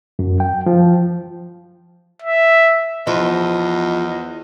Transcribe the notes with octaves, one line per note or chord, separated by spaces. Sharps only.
F#2
G5
F3
E5
E2 F3 D#5